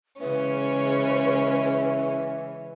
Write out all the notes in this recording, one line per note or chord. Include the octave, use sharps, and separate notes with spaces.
C#3 E3 G#3 C#4 B4